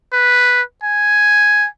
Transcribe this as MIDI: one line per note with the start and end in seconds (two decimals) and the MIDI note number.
0.13 0.62 71
0.83 1.67 80